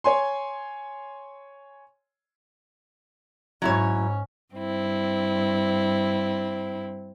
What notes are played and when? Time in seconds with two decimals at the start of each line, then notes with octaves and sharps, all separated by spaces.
0.04 C#5 G#5 C6
3.62 G#2 F#3 C#4 E4 C#5
4.54 G2 C4 E4